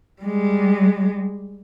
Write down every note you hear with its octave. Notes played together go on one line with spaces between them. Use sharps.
G3 G#3